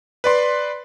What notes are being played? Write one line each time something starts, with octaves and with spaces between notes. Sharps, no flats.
B4 D5 C6